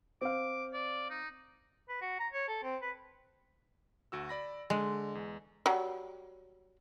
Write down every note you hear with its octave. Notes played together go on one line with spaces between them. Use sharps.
C4 F5 D6
D5
D#4
B4
F#4
A#5
C#5
A4
C4
B4
D2 F#4 E6
D5 B5 A#6
D3 G#3
E2
F#3 G3